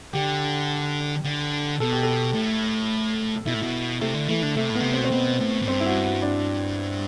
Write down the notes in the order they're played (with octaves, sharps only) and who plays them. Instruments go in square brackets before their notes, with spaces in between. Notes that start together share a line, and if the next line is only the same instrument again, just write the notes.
[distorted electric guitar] D3 [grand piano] G4
[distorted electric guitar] D3
[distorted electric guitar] B2 [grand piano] A4
[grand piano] G4
A4
[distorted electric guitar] A2
[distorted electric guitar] B2 [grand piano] E4
[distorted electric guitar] A2
B2
[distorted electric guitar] C3 [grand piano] A3
[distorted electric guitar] D3
[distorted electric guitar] E3 [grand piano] A3
[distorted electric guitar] D3
[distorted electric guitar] C3 [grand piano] A3
[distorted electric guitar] A2
[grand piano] B3
[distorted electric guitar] D3
C3
[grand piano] C4
[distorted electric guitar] B2
[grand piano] C4
[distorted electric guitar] B2 [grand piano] B3
[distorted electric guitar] A2
A2
[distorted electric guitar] G2 [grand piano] C4
[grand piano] E4
F#4
F#4
D4